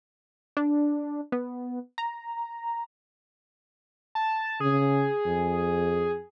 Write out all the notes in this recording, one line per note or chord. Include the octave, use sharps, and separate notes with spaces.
D4
B3
A#5
A5
C#3 G#4
F2